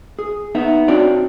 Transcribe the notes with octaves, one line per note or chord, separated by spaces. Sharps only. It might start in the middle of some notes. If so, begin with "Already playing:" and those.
G#4
B3 D#4 E5
C4 D4 F#4 C#5 D5